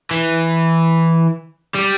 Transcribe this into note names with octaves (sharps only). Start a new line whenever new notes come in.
E3
G3